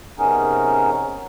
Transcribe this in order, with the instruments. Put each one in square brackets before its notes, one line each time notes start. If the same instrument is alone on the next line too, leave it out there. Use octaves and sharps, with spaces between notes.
[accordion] C3 B3 C#4 D#4 G#4 A#4